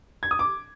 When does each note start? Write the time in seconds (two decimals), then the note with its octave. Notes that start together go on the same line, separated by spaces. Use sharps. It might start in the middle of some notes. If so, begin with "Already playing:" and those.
0.23 G#6
0.31 D#6
0.39 D6